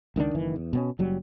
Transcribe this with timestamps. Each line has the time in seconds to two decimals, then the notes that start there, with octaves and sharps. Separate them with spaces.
0.16 C#2 D#3 F#3 D4
0.35 F#1 D#3 E3
0.56 E2
0.73 B2 B3 C#4
0.99 F#1 F#3 G3